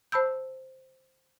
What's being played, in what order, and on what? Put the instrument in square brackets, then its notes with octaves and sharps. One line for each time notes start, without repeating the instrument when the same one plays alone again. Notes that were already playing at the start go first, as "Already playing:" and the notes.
[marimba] C5 A5 B5 E6 G6